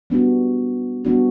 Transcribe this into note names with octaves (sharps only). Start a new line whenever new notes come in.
G3 B3 D4 F#4
G3 B3 D4 F#4